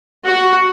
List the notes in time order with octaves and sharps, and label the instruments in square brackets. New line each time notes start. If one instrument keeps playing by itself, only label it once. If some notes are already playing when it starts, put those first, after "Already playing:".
[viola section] F#4